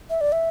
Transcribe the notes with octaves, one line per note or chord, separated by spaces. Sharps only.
E5
D5
E5